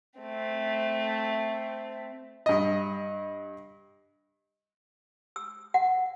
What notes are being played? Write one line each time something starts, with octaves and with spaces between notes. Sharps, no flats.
A3 C4
G2 D#5
E6
F#5